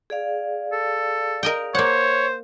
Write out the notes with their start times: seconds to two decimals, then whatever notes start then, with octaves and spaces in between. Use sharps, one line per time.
0.10 G#4 D5 F5
0.72 A4
1.43 A#4 D#5 G5
1.75 A#3 C5 C#5 F#5